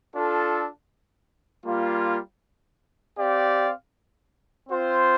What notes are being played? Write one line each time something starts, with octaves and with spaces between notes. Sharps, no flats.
D4 F4 A4
G3 A#3 F4
C4 G4 D5 F5
C4 F4 C5